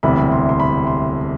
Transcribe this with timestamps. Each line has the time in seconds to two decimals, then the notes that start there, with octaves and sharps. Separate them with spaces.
0.03 E1 D2 C3 E3 G3 B5
0.32 C6
0.49 C6
0.60 B5
0.87 C6